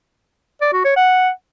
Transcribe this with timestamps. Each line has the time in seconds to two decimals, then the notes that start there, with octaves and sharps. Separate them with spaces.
0.61 D5
0.73 F#4
0.84 C#5
0.96 F#5